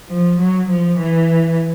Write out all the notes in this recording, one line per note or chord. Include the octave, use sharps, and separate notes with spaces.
F3
F#3
F3
E3